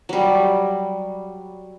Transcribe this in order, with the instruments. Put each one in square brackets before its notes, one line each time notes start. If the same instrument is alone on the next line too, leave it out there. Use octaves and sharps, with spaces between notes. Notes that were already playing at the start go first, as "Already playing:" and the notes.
[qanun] F#3 G3